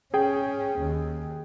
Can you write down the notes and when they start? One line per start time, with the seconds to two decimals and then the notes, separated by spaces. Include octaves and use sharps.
0.14 C#4 G#4 G5
0.81 D#2